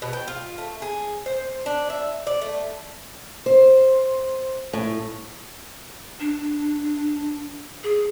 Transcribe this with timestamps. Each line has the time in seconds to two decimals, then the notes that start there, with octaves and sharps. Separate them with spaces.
0.02 B2
0.13 G5
0.28 F4
0.58 A3
0.82 G#4
1.26 C5
1.66 D4
1.90 E5
2.27 D5
2.42 A3
3.46 C5
4.73 A2
6.20 D4
7.84 G#4